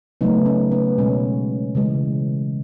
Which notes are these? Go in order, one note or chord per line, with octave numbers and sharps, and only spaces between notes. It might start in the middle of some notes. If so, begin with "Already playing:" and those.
C#3 F#3 A3 B3 D#4
C#4
B3
B2 G#3 C#4
C#3 E3 G#3